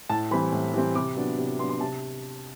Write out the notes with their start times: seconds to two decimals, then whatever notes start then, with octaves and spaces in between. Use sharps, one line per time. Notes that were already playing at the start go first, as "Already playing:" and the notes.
0.09 A2 A5
0.31 E3 G3 C4 B5
0.52 A2
0.73 E3 G3 C4
0.95 C3 D6
1.17 F#3 B3 D4
1.38 C3
1.59 F#3 B3 D4 C6
1.69 C6
1.81 C3 A5